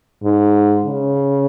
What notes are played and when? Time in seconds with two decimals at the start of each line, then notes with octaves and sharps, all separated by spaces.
0.23 G#2
0.85 C#3